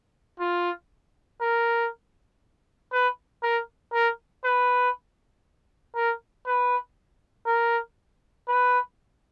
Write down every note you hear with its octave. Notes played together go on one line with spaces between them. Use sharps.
F4
A#4
B4
A#4
A#4
B4
A#4
B4
A#4
B4